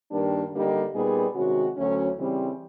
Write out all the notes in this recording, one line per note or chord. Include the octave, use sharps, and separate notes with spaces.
G2 D#3 G3 A#3 D4
D3 G3 A#3 D#4 G4
A#2 G3 B3 D#4 G#4
C3 D#3 G#3 C#4 F#4
D2 D3 F#3 A3 C#4
C#3 E3 G3 C4